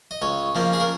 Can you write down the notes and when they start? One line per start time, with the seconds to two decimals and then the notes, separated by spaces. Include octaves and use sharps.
0.11 D#5
0.22 C#2 C#5
0.55 C#3 F3 A#3 C#4
0.73 G#4
0.80 A#4